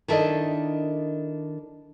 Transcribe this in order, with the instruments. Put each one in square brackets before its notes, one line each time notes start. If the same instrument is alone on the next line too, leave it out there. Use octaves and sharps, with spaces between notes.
[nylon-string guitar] D#3 D4 E4 A4 D5 D#5